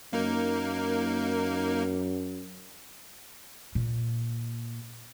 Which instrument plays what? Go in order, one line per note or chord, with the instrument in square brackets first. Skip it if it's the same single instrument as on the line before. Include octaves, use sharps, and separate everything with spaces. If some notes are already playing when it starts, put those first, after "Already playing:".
[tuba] F#2 [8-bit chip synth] A#3 D#4 A#4
[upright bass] A#2